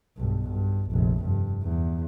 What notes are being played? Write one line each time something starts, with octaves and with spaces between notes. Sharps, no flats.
B1 G2
G2
F1 A#1
G2
E2